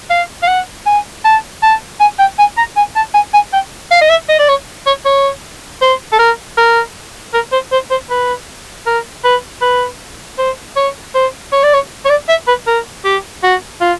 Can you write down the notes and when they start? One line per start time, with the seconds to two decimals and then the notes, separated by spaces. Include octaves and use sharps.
0.10 F5
0.43 F5
0.48 F#5
0.86 G#5
1.25 A5
1.62 A5
2.00 G#5
2.19 G5
2.38 G#5
2.57 A#5
2.76 G#5
2.95 A5
3.14 G#5
3.34 G#5
3.53 G5
3.91 F5
4.01 D#5
4.09 E5
4.29 D#5
4.39 D5
4.48 C#5
4.86 C#5
5.05 C#5
5.81 C5
6.12 A4
6.19 A#4
6.57 A#4
7.34 A#4
7.52 C5
7.72 C5
7.90 C5
8.10 B4
8.86 A#4
9.24 B4
9.61 B4
10.38 C5
10.76 C#5
11.14 C5
11.52 C#5
11.63 D5
11.73 C#5
12.05 C#5
12.09 D5
12.29 E5
12.48 B4
12.67 A#4
13.05 G4
13.43 F#4
13.81 F4